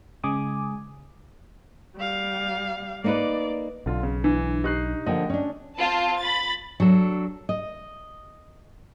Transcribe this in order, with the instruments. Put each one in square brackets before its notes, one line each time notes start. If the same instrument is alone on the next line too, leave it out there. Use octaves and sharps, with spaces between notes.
[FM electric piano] C#3 G#3 G#5 D6 D#6
[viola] G3 F5
[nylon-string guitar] A#3 D#4 B4 [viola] D5
[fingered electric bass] B1 [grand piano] D3 F4
[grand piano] C#3
[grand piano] E3 [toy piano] D4
[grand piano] D#4 F#6 C7 [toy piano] G4
[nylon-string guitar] D3 F3 A#3 [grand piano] D#5 G5
[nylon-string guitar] C#4 D4
[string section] C4 F4 A5
B5 A6
[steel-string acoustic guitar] F#3 D4 A4
D#5